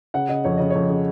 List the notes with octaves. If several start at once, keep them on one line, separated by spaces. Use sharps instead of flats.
C#3 F#5
C#3 D#5
F2 C#5
C#3 D#5
F2 C#5
C#3